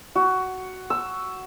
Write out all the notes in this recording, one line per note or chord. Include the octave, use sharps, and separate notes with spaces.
F#4
E6